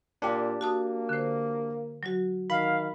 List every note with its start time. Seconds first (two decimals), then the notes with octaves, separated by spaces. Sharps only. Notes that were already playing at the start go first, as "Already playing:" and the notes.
0.22 A#2 D4 G4
0.61 A#3 F#4 A5 D#6
1.09 D3 C5
2.03 F#3 F#4
2.50 D#3 F5 B5